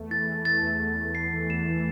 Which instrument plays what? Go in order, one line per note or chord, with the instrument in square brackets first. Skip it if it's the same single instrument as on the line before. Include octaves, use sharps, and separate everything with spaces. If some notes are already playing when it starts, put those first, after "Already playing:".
Already playing: [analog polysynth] E2 A3
[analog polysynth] E3 [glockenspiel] A6
[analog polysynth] E3
[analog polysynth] A3 [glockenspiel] A6
[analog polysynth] E2
E2
E2
[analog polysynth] E2 [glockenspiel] C7
[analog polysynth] E3
[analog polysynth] E2 [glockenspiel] E7
[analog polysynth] E3